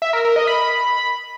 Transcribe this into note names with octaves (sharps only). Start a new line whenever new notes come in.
E5
A#4
A#4
D#5
B5